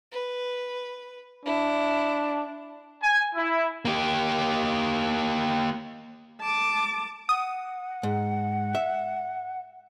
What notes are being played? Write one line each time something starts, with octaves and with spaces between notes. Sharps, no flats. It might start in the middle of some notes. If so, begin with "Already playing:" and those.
B4
D4 E4
G#5
E4
A#3 G4
A5 D6
F#5 D#6
G#2
E5